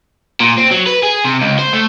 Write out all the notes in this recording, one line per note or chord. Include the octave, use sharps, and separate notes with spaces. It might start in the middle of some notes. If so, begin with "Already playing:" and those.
A#2
C4
F#3
B4
G#4
C3
C#2
C5
A3